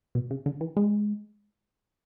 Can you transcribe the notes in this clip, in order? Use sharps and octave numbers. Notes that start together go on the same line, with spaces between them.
B2
C#3
D3
E3
G#3